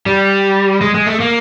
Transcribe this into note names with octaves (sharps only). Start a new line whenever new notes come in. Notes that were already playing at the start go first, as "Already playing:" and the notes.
G3
G#3
G#3
A3
A#3